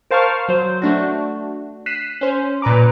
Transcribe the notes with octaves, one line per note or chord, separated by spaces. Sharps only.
A#4 C5 F5 A5 C#6 F6
F#3 C5
A3 D4 F#4
F#6 B6 C7 D#7 E7
C#4 C5
A#2 B4 A#5 D6